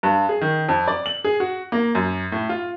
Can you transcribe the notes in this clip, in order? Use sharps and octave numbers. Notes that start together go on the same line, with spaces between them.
G2
G#4
D#3
F2
D5
F#7
G#4
F#4
A#3
F#2
A2
F4